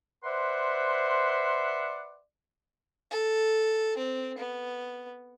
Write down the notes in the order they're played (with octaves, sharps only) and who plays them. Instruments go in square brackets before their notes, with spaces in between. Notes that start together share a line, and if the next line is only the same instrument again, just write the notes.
[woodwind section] B4 C5 D5 E5 F#5 C6
[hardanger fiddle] A4
C4
B3